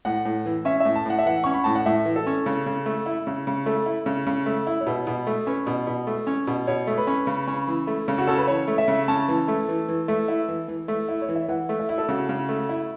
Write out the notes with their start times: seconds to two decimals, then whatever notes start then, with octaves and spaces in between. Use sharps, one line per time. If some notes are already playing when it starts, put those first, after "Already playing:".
0.05 A2 F#5
0.25 A2
0.46 E3
0.65 C#4 E5
0.80 A2 E5
0.96 A5
1.06 A2 F#5
1.19 E5
1.26 E3 F#5
1.44 C#4 C#6
1.54 B5
1.64 A2 A5
1.75 F#5
1.86 A2 E5
2.05 E3
2.16 A4
2.27 C#4
2.46 C#3
2.66 C#3
2.86 A3
3.06 E4
3.27 C#3
3.47 C#3
3.66 A3 A4
3.86 E4
4.06 C#3
4.27 C#3
4.46 A3
4.67 E4
4.80 C#5
4.87 B2 B4
5.07 B2
5.27 A3
5.47 C#4 B4
5.67 B2
5.87 B2
6.07 A3
6.27 C#4
6.47 B2
6.67 B2 C#5
6.87 A3
6.98 B4
7.07 C#4
7.27 C#3
7.48 C#4
7.67 E3
7.87 A3
8.08 C#3
8.18 F#4
8.27 C#4 A4
8.38 B4
8.47 E3 C#5
8.68 A3
8.78 E5
8.88 C#3
9.08 C#4 A5
9.28 E3
9.48 A3
9.68 E3
9.88 E3
10.08 A3
10.28 E4
10.48 E3
10.68 E3
10.88 A3
11.08 E4
11.22 C#5
11.29 E3
11.36 E5
11.48 E3 F#5
11.69 A3
11.79 E5
11.89 E4
11.98 A4
12.09 C#3 F#4
12.29 C#3
12.49 A3
12.69 E4